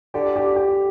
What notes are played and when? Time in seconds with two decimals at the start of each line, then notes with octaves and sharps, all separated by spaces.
0.14 D3 G4
0.36 G4
0.56 G4